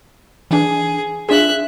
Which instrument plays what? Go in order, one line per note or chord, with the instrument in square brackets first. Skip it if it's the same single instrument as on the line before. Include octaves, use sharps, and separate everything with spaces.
[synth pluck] E3 D4 [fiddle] G#4
[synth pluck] D4 F4 G#4 [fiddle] E5 F#6